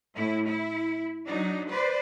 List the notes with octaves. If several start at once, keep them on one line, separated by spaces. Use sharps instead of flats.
A2 E4
E4
F#3 D4 D#4
B4 C5 D5